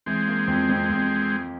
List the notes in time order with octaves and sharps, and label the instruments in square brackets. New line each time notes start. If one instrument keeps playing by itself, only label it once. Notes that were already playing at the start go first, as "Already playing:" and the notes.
[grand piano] E3 [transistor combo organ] G#3 C4
[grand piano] A#3
F2
F2
F2